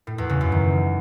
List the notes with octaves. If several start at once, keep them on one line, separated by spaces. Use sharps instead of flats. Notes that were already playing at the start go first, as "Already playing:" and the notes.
A2
E2
C#3
F#2
D#3